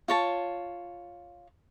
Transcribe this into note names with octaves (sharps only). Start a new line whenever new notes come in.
F4 C#5 A5